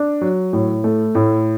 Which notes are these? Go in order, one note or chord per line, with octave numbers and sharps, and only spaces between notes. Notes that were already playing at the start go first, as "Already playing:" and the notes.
Already playing: D4
F#3
A2
A3
A2